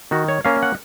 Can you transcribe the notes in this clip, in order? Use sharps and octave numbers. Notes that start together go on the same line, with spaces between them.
D#3 F#4
C#5
A#3 C#4 F5
F#5